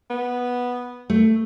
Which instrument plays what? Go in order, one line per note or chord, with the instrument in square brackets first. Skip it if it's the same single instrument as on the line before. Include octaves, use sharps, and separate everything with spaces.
[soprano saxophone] B3
[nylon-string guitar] A3